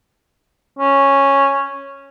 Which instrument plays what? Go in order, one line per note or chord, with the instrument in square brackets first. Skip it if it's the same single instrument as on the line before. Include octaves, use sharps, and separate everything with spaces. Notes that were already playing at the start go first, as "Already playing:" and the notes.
[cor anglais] C#4